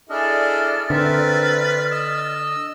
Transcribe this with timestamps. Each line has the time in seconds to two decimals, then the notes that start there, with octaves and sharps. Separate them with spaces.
0.10 D4 E4 G#4 A4 D5 D#5 F6
0.90 D3 C4 A#4 B4 E5
1.91 D#5 E6